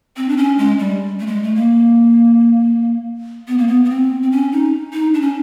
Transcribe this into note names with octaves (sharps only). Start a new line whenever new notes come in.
C4
D4
C#4
G#3
G3
A3
G#3
A3
A#3
B3
A#3
B3
B3
C4
C4
C#4
D#4
D#4
D4
C#4